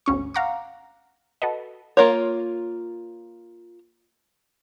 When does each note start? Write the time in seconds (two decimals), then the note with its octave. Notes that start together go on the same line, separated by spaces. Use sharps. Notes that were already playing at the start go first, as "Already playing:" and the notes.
0.06 G#1 D2 C#4 C#6
0.34 F5 F#5 A#5 C#6 D6
1.42 F#4 A4 B4 D#5
1.97 A#3 F4 A#4 C#5